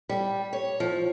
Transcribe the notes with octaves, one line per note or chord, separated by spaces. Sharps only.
G3
C#5
F3